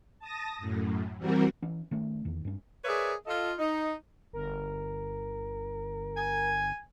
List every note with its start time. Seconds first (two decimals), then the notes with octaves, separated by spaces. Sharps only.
0.19 A5 D#6 A#6
0.59 F#2 A2
1.18 E3 G3 C4 F#4 A#4
1.62 E3 C#4
1.91 D#3 A3 C#4
2.25 E2 D#3
2.45 G2 C#4
2.85 G#4 A#4 B4 C#5 D5 E5
3.26 F4 A4 D#5
3.58 D#4
4.33 G1 A#4
6.17 G#5